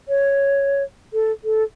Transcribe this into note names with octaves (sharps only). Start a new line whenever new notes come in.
C#5
A4
A4